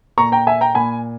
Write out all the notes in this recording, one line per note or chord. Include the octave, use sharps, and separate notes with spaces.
A#2 A#5 C#6
G5 A#5
E5 G#5
G5 A#5
A#2 G#5 B5